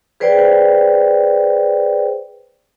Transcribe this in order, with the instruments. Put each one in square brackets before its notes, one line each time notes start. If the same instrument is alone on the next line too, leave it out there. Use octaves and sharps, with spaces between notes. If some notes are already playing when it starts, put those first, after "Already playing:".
[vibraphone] G#4 B4 C5 D5 G5